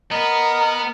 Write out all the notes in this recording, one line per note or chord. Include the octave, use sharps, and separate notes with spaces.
B3 A#4 D#5